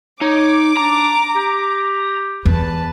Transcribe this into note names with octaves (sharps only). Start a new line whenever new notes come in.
D#4 C#5 D6
D4 A#5
G4
E2 B4 A5